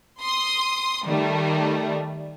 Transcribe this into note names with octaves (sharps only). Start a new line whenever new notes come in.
C6 D#6
D#3 G3 A3